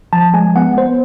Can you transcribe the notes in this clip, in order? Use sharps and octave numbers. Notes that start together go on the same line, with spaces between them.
F3 A5
G#3 G#5
B3 F#5
B3 C5